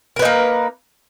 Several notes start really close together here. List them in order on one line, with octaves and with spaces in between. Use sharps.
A#4 B4 D#4 A#3